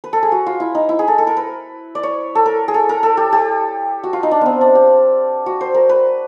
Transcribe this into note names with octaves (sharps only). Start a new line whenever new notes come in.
B4
A4
G#4
F#4
F4
E4
D#4
E4
G#4
A4
A4
A#4
B4
D5
C#5
A4
A#4
G#4
A4
A#4
A4
G4
G4
F#4
F4
D#4
D4
B3 C4
D4
G4
F#4
C5
A#4
B4